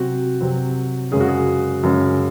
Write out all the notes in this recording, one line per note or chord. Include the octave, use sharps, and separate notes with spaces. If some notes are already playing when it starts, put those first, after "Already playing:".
Already playing: C3 F#3 C4 F#4
C3 F#3 C4
F#2 C#3 G#3 C#4 G#4
F#4
G#4
F#2 C#3 G#3 C#4